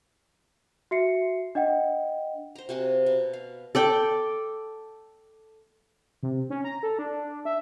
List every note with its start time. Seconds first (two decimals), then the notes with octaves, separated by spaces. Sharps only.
0.91 F#4 E5 C7 C#7
1.55 D4 D#5 F#5 G5
2.56 C5 A#5
2.69 C3 A#3 F#4 G#5
3.06 B2
3.33 F5
3.75 A4 D5 G5
6.23 C3
6.50 C#4
6.64 A#5
6.83 A4
6.99 D4
7.45 E5